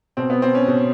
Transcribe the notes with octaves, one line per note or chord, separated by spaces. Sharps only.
B2 C4
B3
C4
C#4
B2